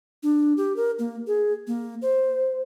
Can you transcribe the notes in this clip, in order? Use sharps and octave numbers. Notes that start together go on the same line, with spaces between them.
D4
G4
A#4
A#3
G#4
A#3
C5